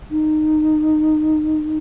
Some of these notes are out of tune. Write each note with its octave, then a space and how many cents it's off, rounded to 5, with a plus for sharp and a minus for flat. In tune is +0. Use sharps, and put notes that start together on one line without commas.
D#4 -15